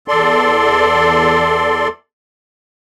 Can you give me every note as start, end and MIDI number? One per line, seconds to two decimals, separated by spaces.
0.08 1.88 40
0.08 1.88 69
0.08 1.88 74
0.08 1.88 84